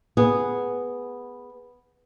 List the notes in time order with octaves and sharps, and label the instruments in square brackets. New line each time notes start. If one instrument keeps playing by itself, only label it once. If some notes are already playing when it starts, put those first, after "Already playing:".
[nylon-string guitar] B3 G#4